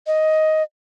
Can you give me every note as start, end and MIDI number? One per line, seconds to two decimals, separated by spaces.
0.07 0.63 75